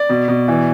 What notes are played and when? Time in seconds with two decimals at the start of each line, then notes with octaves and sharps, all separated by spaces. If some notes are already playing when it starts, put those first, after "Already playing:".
Already playing: D5
0.09 B2
0.28 B2
0.48 E3